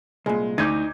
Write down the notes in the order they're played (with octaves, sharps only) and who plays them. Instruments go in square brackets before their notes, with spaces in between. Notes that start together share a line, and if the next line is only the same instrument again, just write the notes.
[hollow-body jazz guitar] C2 A#2 [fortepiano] G#3
[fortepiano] D2 [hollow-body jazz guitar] D#4 [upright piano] D6 G6 G#6